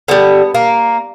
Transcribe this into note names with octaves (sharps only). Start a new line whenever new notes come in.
D3 G3 B3
A#3